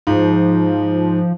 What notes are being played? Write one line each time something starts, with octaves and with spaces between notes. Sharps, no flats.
G#2 F3